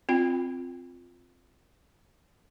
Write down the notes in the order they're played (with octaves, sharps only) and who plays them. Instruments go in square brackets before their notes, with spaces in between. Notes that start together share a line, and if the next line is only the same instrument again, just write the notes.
[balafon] C4 F4 G5